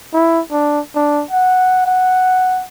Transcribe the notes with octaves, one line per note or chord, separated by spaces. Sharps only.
E4
D4
D4
F#5
F#5